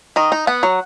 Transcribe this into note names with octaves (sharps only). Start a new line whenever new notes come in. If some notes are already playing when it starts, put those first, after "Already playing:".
D#3 D#5
D#4
B3 F#5
F#3